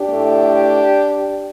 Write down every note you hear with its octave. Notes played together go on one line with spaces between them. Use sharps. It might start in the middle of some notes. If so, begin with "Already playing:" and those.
Already playing: D4 G4
A2 A3